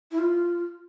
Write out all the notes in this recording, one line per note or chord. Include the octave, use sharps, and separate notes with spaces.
E4
F4